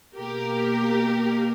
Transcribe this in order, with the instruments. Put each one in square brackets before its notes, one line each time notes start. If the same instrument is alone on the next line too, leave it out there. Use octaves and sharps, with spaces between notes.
[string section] B2 A#3 G4 A#4